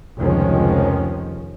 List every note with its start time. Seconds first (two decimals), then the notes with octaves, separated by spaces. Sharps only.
0.18 F1 C#2 D#3 F3 G#3 C#4